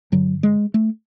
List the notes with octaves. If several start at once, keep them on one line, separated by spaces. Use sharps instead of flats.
G2 D3 F#3
G#3
A3